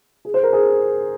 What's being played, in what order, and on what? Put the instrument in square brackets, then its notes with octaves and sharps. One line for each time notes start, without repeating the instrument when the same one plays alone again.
[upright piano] G#4
C5
A#4
G#4